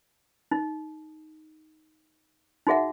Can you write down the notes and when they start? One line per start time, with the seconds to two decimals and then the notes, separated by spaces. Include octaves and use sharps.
0.51 D#4
2.67 D#4 F#4 G#4 E5 F#5